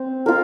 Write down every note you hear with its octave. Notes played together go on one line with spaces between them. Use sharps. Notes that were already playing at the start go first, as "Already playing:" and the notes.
Already playing: C4
F4 A#4